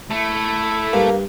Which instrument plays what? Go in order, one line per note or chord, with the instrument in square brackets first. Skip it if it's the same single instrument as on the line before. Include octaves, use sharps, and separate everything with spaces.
[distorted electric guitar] A3 [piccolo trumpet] E4
[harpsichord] G2 [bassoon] A#3